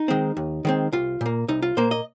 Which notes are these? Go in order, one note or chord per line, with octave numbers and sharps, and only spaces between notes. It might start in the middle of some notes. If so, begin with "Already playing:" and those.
Already playing: D#4
D#3 G#3 C4
D#2
D#3 G#3 C4
C2 F4
A#2 A#3
C2 D#4
F4
A#2 A#3 C5
D#5